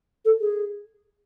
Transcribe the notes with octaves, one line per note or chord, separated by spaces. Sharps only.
A4
G#4